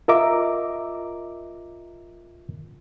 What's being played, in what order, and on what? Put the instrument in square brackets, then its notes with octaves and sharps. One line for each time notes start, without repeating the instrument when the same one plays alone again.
[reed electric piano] F4 A#4 D#5 E5 A#5 D6